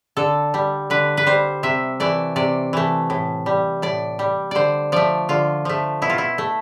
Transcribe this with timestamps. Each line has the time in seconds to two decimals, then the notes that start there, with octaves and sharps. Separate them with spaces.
0.17 D3 A4
0.54 G3
0.90 D3 B4
1.17 B4
1.27 G3 C5
1.63 C3 E5
2.00 E3 A3 D5
2.36 C3 D5
2.73 E3 A3
3.10 A2
3.46 G3
3.82 A2 D5
4.19 G3
4.51 D3 C5 D5
4.92 F3 A3 D5
5.29 D3 F4
5.65 F3 A3
6.02 B2 E4
6.10 F4
6.18 E4
6.38 A3